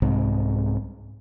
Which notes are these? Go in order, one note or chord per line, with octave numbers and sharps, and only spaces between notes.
C2 G#2 C3 G#3